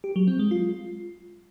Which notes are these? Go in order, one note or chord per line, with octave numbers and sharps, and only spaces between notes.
G4
F#3
C4
G#3
F4